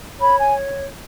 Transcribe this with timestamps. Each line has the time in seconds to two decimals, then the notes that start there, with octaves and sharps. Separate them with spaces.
0.19 C#5 B5
0.39 G#5